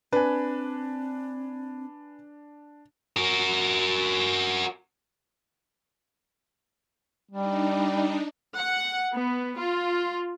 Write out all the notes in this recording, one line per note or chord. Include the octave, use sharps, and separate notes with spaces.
C4 D4 B4 G#5
F#4 A#4
G3 D4 D#4
F#5
B3
F4